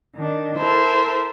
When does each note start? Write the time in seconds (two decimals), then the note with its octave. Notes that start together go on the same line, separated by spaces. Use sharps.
0.16 D#3 D4
0.57 E4 A4 A#4 C5 E5